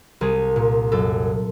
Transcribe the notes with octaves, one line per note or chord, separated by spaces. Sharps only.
C2 G#4
A#2
F#2 A4